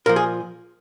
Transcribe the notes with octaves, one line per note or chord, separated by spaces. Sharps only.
A#2 F3 A#4
G#4